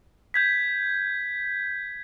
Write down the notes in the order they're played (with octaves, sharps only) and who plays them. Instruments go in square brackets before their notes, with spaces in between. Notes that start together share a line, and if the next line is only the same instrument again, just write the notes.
[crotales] G6 G#6 B6